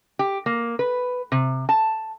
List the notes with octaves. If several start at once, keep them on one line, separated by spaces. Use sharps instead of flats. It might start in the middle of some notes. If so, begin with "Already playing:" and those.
G4
A#3
B4
C3
A5